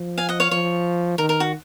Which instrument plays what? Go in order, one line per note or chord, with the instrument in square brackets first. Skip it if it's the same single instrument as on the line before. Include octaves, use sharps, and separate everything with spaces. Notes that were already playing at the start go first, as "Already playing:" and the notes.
Already playing: [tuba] F3
[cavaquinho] F5 G#5
D#5 F#5
C#5 F5
[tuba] F3 [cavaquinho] C#5
[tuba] D#3 [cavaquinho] A#4
[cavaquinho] A#4
F#4